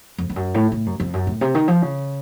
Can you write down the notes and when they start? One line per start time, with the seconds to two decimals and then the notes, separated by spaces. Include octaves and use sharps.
0.18 F2
0.30 F2
0.36 F#2
0.54 A2
0.72 A2
0.86 F#2
1.00 F2
1.13 F#2
1.27 A2
1.41 C3
1.54 D#3
1.68 F3
1.82 C#3